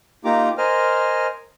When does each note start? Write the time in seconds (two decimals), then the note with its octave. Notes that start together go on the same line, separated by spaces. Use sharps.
0.25 A#3 D#4 F4 G4 A#5 D6
0.58 A#4 C5 D#5 G#5 F6